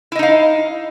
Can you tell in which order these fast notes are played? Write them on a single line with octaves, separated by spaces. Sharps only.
E4 D#5 D#4 F5